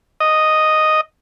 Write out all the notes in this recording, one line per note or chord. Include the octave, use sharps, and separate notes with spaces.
D#5